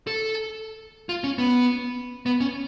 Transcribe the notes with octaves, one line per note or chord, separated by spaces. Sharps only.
A4
F4
C#4
B3
B3
C#4